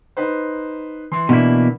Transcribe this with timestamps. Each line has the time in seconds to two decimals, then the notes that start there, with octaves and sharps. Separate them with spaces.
0.17 D#4 B4 C5
1.12 E3 C6
1.29 B2 A#3 D4 E4